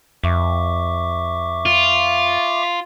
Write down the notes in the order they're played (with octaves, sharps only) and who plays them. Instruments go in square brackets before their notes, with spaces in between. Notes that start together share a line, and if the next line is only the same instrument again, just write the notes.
[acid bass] F2 [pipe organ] E5 C#6 D6
[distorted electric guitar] F4